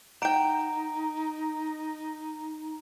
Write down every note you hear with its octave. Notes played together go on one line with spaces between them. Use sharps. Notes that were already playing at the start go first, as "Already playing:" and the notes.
D#4 F#5 G5 A#5 D7